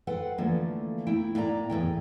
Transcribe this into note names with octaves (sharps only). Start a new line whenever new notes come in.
A4 B4 C5 F#5 G5
D3 E3 F3 A3 A#3
A3 D#4 E4 G5
A2 A#3 D5 A5 A#5
E2 A2 F#3 G5